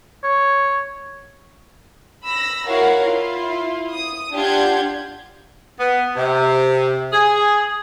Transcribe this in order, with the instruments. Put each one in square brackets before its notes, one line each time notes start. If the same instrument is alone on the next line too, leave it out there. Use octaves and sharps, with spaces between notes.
[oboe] C#5
[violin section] B5 E6 A#6
E4 F#4 A#4 C#5 F5
E4 F4
D#6
D4 F4 G4 F#5 G6 G#6
[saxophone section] B3
C3
G#4